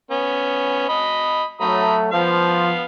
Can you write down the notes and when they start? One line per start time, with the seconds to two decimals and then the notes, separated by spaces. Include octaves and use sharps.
0.11 B3 C#4
0.89 D#5 B5
1.61 F#3 A3 A#5 B5 D#6
2.12 F3 B3 F5